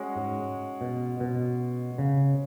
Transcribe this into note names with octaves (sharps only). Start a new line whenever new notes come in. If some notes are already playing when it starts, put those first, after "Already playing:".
Already playing: G#3 C#4 F#4 C#5
G#2
B2
B2
C#3